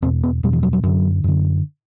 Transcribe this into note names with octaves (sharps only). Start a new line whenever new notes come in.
E2 B2 C4
B3
E2 B2 G3
E3
F#3
F#3
F#2 D3 F#3
F#2 D3